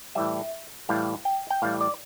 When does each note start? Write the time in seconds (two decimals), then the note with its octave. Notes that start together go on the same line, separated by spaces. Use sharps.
0.15 A2 E3 G3 E5
0.89 A2 E3 G3 F5
1.25 G5
1.50 G5
1.62 A2 E3 G3 F5
1.81 D5